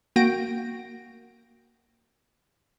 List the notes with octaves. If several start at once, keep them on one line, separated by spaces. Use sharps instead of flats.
A#3 F#4 G5 A#6 D7